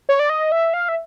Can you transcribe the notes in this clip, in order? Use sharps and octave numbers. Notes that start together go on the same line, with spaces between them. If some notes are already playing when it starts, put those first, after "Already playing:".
C#5
D5
D#5
E5
F5
E5